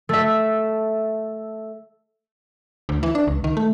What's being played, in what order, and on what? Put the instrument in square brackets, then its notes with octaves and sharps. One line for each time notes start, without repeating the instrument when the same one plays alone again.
[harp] A3 E5
[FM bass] D2
E3
D4
C#2
D#3
A3